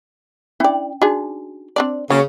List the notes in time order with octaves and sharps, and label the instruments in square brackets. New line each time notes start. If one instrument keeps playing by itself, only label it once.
[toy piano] C#4 D4 G5 [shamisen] E4 D5
[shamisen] D4 G#4 [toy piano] D#4 F#4
[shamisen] C4 D4 D5
[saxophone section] C#3 [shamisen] F#3 A#3 C#5